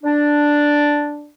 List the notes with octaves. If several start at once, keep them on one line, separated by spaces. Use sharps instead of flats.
D4